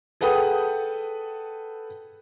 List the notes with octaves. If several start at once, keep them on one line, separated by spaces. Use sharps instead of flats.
G#4 A4 B4 F#5 G5 D#6